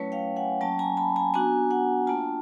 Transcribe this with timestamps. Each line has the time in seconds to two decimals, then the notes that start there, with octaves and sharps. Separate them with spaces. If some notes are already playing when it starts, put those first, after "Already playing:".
Already playing: F#3 A3 C#4 E4 B4 C#5
0.12 F5 G5
0.36 F#5 G#5
0.61 F#3 A#3 C#4 G5 A5
0.79 G#5 A#5
0.97 A5 B5
1.16 G#5 A#5
1.34 B3 D4 F#4 G#5 A#5
1.71 F#5 G#5
2.07 A#3 D4 F4 G5 A5